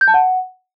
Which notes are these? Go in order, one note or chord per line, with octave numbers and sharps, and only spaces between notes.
G6
A5
F#5